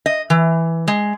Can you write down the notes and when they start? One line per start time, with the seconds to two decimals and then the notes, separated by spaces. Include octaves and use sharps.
0.06 D#5
0.30 E3
0.88 G#3